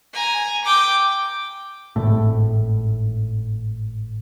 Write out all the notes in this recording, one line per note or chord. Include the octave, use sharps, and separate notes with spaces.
G#5 A#5
G5 D6
G#1 A2